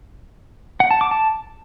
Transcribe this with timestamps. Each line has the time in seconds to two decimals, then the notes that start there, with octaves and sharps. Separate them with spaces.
0.80 F#5
0.91 A5
1.01 D6
1.11 A5